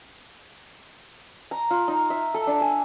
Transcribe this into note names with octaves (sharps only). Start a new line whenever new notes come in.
A#5
F4
D#4
E5
A4
D4
G#5